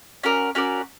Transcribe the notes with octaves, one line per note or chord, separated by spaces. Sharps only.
C#4 F#4 A#4 D5
C#4 F#4 A#4 D5